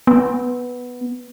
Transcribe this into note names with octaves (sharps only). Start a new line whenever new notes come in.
B3